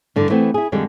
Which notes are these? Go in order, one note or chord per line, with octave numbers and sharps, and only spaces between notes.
G2 D3 E3
E3 A3 B3 C4
E4 G#4
F2 D3 G3 G#3